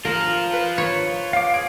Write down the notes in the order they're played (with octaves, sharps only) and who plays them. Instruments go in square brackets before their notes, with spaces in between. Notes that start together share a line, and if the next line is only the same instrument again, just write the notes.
[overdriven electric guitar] F4 C5 [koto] A#4
[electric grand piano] B4
[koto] C#5
[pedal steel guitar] F5 D6
[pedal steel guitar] G#4 [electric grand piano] D7